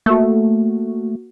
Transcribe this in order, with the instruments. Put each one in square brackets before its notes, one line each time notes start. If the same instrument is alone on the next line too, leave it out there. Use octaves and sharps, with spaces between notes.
[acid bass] A3 [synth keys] A#3 F#4